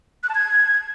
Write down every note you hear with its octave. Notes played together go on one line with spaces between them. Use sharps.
F#6
A5
G#6